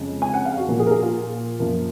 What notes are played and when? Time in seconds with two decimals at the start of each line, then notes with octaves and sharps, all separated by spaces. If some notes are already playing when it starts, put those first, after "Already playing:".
Already playing: F2 C#3 G#3
0.22 G#5
0.34 F#5
0.45 F5
0.57 F#4
0.68 A#2 F3 A#3
0.80 G#4
0.87 A#4
0.91 G#4
1.03 F4
1.60 F#2 F3 A#3